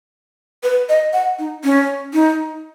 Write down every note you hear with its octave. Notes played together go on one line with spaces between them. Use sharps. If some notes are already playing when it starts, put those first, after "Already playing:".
B4
D#5
F#5
D#4
C#4
D#4